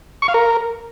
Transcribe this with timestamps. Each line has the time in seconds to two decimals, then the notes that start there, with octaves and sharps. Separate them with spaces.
0.22 C#6
0.28 F5
0.34 A#4